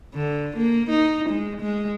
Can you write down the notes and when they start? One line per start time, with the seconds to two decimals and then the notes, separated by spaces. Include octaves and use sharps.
0.14 D3
0.57 A#3
0.90 D#4
1.29 G#3
1.60 G#3